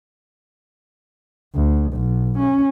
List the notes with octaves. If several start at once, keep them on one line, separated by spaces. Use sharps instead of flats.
D2
B1
C#4